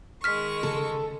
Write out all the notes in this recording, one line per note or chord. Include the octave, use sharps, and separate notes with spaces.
D#3 G#3 C#6 F6 B6
C#3 A4